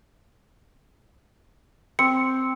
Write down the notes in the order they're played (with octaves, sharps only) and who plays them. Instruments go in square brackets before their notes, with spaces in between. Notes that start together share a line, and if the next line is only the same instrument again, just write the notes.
[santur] C4 [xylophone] C#7